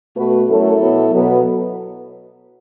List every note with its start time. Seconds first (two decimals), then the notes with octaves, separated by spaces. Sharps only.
0.16 B2 A3 F#4 B4
0.49 F#2 F#3 A3 E4 A4
0.81 B2 F#3 B3
1.12 B2 F#3 B3